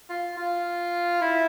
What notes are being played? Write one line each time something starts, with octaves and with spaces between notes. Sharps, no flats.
F4
F4
E4